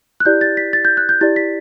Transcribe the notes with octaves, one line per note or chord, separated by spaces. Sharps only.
F#6
E4 G4 D5 G6
A6
B6
A6
G6
F#6
G6
E4 G4 D5 A6
B6